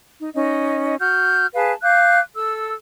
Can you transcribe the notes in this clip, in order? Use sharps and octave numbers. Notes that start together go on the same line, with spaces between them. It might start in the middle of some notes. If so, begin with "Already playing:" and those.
D#4
C#4 D#4 D#5
F#4 F6 G6
G#4 B4 F5 A5
F5 D6 F#6 G6
A4 E6